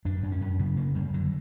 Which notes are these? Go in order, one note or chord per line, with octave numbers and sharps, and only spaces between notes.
F#2 D4
F#2
C#4
F#2
C#3 B3
C#3 A#3
F#2 G3
D3 F#3